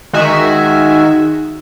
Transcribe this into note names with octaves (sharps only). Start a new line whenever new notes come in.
D#3 G#3 F#4 E5 G#5